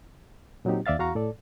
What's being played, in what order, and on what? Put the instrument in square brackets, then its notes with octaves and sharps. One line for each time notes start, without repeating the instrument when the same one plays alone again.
[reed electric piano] A#2 F#3 C4 D#4 G4
D#2 D5 E5 F5 A6
E2 F#4 F5 A#5 C#6
A2 A4 D5